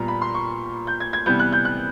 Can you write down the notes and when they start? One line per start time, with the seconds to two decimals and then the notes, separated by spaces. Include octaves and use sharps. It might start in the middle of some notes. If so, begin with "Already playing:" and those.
Already playing: A#2 G3 B3 A#5
0.08 B5
0.22 C6
0.34 C#6
0.87 G6
1.00 G#6
1.13 G#6
1.26 C3 E3 G3 B3 G6
1.39 F#6
1.53 G6
1.65 F#6